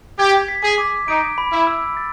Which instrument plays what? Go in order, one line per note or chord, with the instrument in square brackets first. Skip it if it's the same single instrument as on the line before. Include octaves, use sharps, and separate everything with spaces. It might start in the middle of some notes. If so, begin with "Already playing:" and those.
[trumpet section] G4 [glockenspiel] G#6
[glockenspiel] B6
[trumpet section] G#4
[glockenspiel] D6
[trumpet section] D#4 [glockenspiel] D7
[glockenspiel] B5
[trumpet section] E4
[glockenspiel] E6
A6